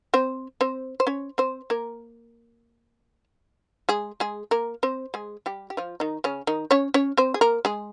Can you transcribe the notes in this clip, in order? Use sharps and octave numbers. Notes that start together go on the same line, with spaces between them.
C4 C5
C4 C5
C5
C#4 C#5
C4 C5
A#3 A#4
G#3 G#4
G#3 G#4
A#3 A#4
C4 C5
G#3 G#4
G3 G4
G4
F3 F4
D#3 D#4
C#3 C#4
D#3 D#4
C#4 C#5
C#4 C#5
C4 C5
G#4
A#3 A#4
G#3 G#4